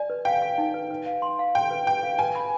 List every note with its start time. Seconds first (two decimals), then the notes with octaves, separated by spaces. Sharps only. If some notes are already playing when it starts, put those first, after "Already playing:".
Already playing: D5 G#5
0.10 B4
0.25 F5 G5
0.42 F5
0.58 D#4
0.74 B4
0.91 B4
1.06 F5
1.22 C6
1.39 F5
1.55 G5 C6
1.71 B4
1.87 B4 G5
2.03 F5
2.19 B4 G#5
2.35 B5